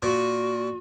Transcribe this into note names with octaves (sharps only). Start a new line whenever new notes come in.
A#2 F#4